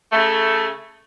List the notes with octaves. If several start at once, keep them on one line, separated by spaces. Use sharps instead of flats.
C#3 A3